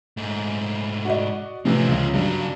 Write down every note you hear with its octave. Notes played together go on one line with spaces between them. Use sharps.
G#2 A3
F#4 D5 D#5
A2 C3 E3 F3 C#4
C#2 C#3
G2 C#3 F#3